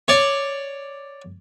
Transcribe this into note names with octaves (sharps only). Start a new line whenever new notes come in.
C#5 D5